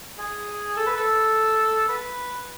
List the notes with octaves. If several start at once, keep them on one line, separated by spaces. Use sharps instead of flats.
G#4
A4
B4
A4
B4